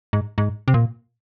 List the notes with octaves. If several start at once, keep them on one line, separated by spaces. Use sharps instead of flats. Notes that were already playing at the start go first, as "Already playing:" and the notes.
G#2
G#2
C3
A#2